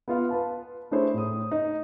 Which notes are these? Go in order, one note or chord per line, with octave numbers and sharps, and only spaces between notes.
B3 F4 F5
B4 A5
A3 D4 E4 G#4 C5 C#5
A2 D#6
D#4